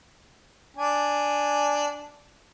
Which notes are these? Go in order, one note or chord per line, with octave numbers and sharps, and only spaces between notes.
D4 G#5